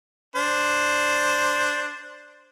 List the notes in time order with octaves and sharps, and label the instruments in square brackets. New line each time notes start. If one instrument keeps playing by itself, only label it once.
[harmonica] D4 C5